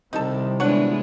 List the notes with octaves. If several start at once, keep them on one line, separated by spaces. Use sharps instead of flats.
C2 C3 D#3 G3 D#4 A4
G1 E3 G#3 D4 C#5 F#5